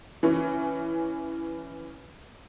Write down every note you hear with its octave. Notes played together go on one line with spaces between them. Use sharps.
E3 C#4